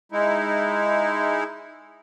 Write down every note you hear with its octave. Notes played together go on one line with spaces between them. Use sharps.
G#3 D#4 E4